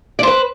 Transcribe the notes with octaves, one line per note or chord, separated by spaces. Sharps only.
B4 C5 D5